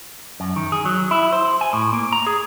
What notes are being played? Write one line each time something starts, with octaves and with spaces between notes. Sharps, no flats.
F#2
D#3
G#4
F#3
E4
C5
G#5
A2
A#3
A#5
G#4